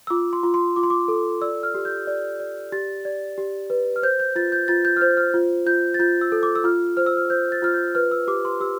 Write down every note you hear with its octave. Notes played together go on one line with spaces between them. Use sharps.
E6
F4 D6
C6
F4
C6
F4 D6
C6
D6
A4
D5 E6
F6
G4
G6
D5
D5
G4 A6
D5
G4
B4
F6
C5 G6
G6
F4 A6
G6
F4 A6
G6
F6
C5 G6
F6
F4
F4 G6
A6
F4 G6
E6
A4
D6
E6
F4 F6
C5 F6
E6
F6
C5 G6
A6
F4 F6
G6
B4 F6
E6
G4 D6
C6
G4 E6